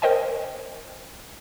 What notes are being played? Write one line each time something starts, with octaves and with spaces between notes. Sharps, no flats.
A#4 C5 D#5 G5 G#5